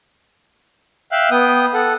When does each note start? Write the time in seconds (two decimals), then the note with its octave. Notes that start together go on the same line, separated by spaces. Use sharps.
1.12 E5 F5 G5 F#6
1.31 B3 G5 D#6
1.74 A4 F#5